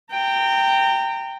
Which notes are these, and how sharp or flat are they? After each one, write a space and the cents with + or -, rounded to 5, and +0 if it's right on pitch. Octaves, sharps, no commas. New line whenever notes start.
G5 +0 A#5 -30